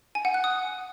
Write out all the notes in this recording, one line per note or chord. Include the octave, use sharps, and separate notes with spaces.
G#5
F#5
F#6
D#6